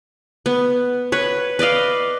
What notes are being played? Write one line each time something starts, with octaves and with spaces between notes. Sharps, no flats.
B3
B4 C#5
B4 D5 D#5 F5